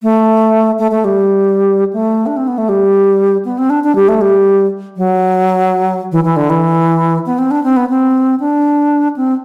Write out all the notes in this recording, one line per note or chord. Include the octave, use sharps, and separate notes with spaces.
A3
A3
A3
G3
A3
D4
C4
B3
A3
G3
B3
C4
D4
D4
G3
A3
G3
F#3
E3
E3
D3
E3
B3
C4
D4
C4
B3
C4
D4
C4